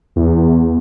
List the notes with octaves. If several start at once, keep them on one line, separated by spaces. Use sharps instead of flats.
E2